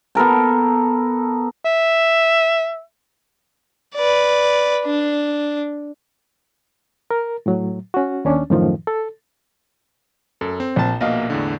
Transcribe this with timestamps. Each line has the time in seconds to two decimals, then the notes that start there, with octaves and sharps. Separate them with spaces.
0.15 B3 A4 A#4 A5
1.65 E5
3.95 B4 D5
4.85 D4
7.11 A#4
7.46 A2 F#3
7.94 C#4 F#4
8.25 D#2 C#4 D4
8.50 F#2 A2 D#3 F3
8.87 A4
10.41 F#2 A4
10.60 C4
10.76 A#1 A5
11.01 A#1 B2 A#3 D#5 F5
11.30 E2 A2 D3